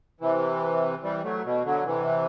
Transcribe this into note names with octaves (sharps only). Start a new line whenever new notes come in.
C3 E3
E3 G3
F#3 A3
B2
D3 F#3
C3 E3